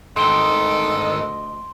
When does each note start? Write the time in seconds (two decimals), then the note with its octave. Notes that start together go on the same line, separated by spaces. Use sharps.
0.16 D2 G#2 D#3 A4 D#5 C6 D7 G7